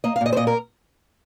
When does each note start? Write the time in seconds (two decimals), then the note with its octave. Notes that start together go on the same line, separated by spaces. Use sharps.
0.04 A#3 D#5
0.16 F5
0.21 A#2 D#5
0.33 C5
0.36 A#2 D#5
0.47 A#4